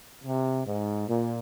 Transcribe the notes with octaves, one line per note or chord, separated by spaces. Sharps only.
C3
G#2
A#2